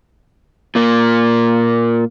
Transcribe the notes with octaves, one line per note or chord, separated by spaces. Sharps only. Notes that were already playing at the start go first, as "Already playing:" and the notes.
A#2 A#3